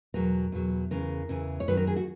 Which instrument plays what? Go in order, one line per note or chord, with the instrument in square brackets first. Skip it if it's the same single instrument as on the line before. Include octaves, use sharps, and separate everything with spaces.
[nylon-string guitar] E2 B2 F#3 A#4
E2 B2 F#3
E2 C#3 E3 A#4
E2 C#3 E3
C#5
F#2 D#3 F#3 B4
A#4
G#4
F#4